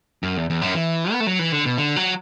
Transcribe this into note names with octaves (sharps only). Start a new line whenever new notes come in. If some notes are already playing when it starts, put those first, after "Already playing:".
F#2
E2
E2
F#2
E3
B3
A3
F#3
E3
D3
B2
D3
F#3